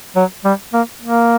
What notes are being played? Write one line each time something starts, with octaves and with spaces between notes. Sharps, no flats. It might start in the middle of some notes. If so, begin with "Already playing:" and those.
F#3
G3
A#3
A#3